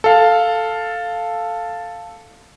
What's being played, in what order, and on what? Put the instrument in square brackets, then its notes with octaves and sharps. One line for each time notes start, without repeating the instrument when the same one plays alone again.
[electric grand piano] A4 F5